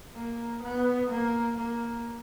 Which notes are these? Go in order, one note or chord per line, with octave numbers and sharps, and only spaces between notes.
A#3
B3
A#3
A#3